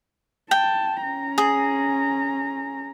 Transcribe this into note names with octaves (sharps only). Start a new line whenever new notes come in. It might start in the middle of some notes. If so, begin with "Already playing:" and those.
G5 A5
C#4 A#5
G#4